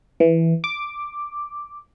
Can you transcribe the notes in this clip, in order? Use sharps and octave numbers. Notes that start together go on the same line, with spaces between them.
E3
D6